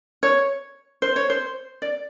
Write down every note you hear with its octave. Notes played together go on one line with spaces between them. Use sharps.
C#5
C5
C#5
C5
D5